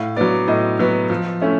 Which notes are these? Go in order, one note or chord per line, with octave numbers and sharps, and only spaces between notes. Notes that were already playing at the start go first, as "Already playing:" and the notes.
Already playing: A2 F5
F#3 B3 D5
A2 D#5
F#3 B3
F3
A3 C#4 E4